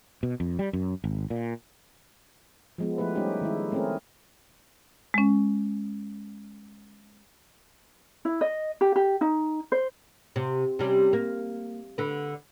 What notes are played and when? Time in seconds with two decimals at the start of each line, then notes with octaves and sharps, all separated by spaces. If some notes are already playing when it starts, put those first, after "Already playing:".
0.23 B2
0.40 F2
0.59 G3
0.73 F#2
1.04 G#1
1.30 A#2
2.78 F3 G#3 B3
2.98 F3 A3 E4 G4 B4
3.15 G3 A3 C#4 D#4 G4 G#4
3.41 D#3 G#3 E4
3.72 A3 C4 C#4 E4 G#4 A#4
5.14 G#3 C#4
8.25 E4
8.41 D#5
8.81 G4
8.96 G4
9.21 D#4
9.72 C5
10.36 C3
10.79 C3 G3 C#4
11.13 A#3
11.98 D3 B4